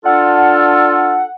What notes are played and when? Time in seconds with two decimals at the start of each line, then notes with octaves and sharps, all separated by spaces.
0.05 D4 F4 A4 F#5